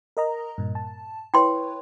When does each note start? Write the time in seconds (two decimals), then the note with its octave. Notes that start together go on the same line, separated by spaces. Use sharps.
0.17 A#4 D#5 A#5
0.58 G2 A#2
0.75 A5
1.34 E4 B4 C#5 G5 C6